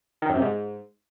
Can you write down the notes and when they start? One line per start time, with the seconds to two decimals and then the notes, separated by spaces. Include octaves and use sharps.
0.22 D#3
0.29 F#2
0.35 C3
0.42 G#2